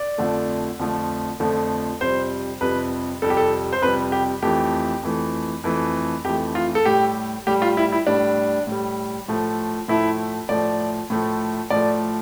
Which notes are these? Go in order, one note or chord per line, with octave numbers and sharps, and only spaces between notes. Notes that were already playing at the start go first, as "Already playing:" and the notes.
Already playing: D5
F2 D3 F3 A3
F2 D3 F3 A3
F2 D3 F3 A3
F2 C3 G3 C5
F2 C3 G3 B4
F2 C3 G3 A4
G4
A4
C5
F2 C3 G3 B4
G4
F2 E3 A3 G4
F2 E3 A3
F2 E3 A3
F2 E3 A3 G4
F4
A4
A2 G3 G4
A2 G3 G4
F4
E4
E4
A2 G3 D4
A2 G3
A2 F3 A3
A2 F3 A3 E4
A2 F3 A3 D5
A2 F3 A3
A2 F3 A3 D5